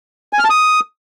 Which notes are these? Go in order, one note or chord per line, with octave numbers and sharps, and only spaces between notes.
G#5
F6
A5
D#6